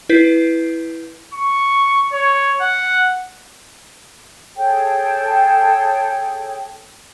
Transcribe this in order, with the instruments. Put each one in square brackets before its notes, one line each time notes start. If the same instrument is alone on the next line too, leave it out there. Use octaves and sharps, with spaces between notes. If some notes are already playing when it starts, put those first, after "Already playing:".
[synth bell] E4 B4 G6 B6 C7
[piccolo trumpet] C#6
C#5
F#5
[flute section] G#4 A4 C#5 G5